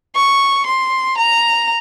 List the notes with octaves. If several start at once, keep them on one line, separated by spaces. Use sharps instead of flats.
C#6
C6
A#5